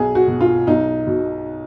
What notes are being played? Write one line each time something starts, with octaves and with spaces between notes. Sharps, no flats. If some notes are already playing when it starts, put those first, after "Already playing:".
Already playing: B1 G#4
F#4
B2
F4
B1 D#4
B2